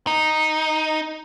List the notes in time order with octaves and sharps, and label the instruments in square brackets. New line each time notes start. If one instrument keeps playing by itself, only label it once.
[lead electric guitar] D#4